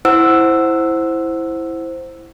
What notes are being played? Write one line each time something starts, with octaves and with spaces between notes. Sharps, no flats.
E4 C5 F#5 E6